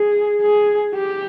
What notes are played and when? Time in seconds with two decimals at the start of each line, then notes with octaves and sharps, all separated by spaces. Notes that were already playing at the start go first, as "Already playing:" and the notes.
Already playing: G#4
0.42 G#4
0.94 G4